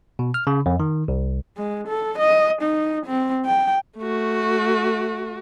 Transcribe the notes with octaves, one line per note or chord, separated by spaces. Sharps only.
B2
F6
C#3
F2
D#3
C2
G#3
A4
D#5
D#4
C4
G5
A3 F#4